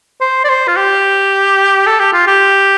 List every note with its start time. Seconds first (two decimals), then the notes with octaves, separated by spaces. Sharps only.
0.21 C5
0.44 D5
0.49 C5
0.67 F4
0.76 G4
1.86 A4
1.99 G4
2.13 F4
2.27 G4